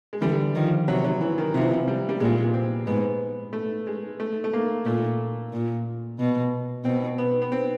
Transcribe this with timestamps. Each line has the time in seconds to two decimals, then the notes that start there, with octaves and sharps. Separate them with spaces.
0.13 G#3
0.21 D3 E3 G3
0.55 D#3 F3
0.88 C3 F#3
1.04 F#3
1.21 E3
1.38 D#3
1.54 C3 F3
1.61 E3
1.70 F3
1.88 G3
2.09 G3
2.20 A#2 G#3
2.54 C4
2.87 G#2 B3
3.53 A3
3.87 G#3
4.20 A3
4.44 A3
4.53 A#3
4.86 A#2 A3
5.53 A#2
6.19 B2
6.85 B2 C4
7.18 B3
7.42 B3
7.52 C4